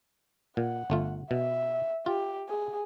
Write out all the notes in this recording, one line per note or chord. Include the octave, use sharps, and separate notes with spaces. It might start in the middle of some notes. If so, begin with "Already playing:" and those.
A#2 F#5
G1 A3 F4
B2 E5
F4 G4
G#4